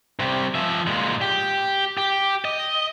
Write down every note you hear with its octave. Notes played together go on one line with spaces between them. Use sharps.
C3 G3
F3 E5
A#2 G#3
G4
G4
D#5